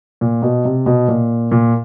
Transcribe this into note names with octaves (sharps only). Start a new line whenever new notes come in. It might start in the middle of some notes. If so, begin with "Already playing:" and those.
A#2
B2
C3
B2
A#2
A#2